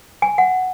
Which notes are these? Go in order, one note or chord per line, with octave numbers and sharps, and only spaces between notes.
G#5
F#5